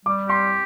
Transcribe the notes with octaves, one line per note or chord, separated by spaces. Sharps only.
G3 D6
G4 C6